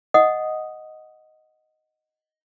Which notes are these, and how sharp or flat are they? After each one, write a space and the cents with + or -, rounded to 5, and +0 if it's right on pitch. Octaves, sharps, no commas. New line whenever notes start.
D#5 +0 F#5 +0 D#6 +0